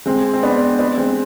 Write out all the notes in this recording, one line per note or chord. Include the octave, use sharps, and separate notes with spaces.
G#3 C4
C4
B3 D4
B3 D4
G#3 C4